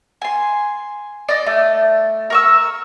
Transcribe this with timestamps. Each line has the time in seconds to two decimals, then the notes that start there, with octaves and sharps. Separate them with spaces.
0.22 G#5 C6
1.29 D5 D#5
1.46 A3
2.30 A#4 C#6 E6